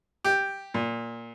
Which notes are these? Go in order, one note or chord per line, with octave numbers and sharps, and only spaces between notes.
G4
A#2